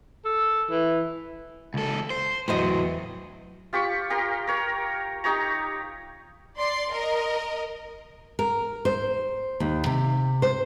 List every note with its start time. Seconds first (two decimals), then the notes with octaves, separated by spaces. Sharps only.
0.25 A4
0.70 E3
1.74 C#2 A4
2.10 C5
2.48 E2 A2 F#3 C5 D#5
3.73 F4 G4 B5 C#6
4.10 G4 A#4 C6
4.47 A#4 C#5
5.24 D#4 G4 C#5 A#5
6.58 D5 C6
6.92 A#4 D#5
8.39 A#4
8.85 C5
9.60 D#2
9.86 C3
10.42 C5